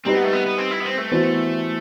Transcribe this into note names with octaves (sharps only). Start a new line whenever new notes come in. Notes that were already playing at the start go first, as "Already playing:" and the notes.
G3 C4 D#4 G4 B4
B3
A3
B3
B3
C4
E4
B3
C4
A3
E3 B3 F#4 C5